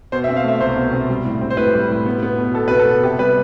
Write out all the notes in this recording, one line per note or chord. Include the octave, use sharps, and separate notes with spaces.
B2 C5
E5
C4
F5
A3 E5
C2 C5
B2
C4
G3
A2
C4
C5
A2 B4
G3
A2
B3
B3
B2
B2 A4
B3 B4
A4
B3
C3 G4
G3 B4